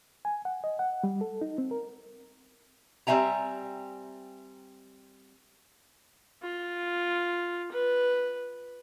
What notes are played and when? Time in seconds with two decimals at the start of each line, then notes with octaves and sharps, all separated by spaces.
0.25 G#5
0.45 F#5
0.64 D#5
0.79 F#5
1.04 G3
1.21 A4
1.41 D#4
1.58 C4
1.71 A#4
3.07 G3 C4 E5 G#5 A#5
6.42 F4
7.72 B4